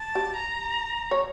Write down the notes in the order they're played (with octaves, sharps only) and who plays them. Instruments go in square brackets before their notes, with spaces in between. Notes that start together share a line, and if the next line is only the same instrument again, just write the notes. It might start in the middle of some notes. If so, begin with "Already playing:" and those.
Already playing: [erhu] A5
[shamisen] G4
[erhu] A#5
[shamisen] C#5